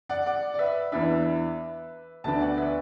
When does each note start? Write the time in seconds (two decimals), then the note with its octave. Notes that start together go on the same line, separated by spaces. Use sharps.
0.09 D5 F#5
0.26 D5 F#5
0.54 D5
0.59 B4 E5
0.92 E2 E3 D4 B4 E5
2.24 D2 D3 B3 D4 E5 A5
2.40 D5 F#5
2.57 B4 E5